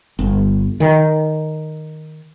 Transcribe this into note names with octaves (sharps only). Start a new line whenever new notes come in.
G1
D#3